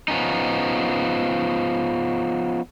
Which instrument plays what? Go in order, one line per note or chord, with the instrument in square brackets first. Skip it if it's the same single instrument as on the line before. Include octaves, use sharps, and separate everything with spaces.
[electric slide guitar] F3 B3 C#4 D#4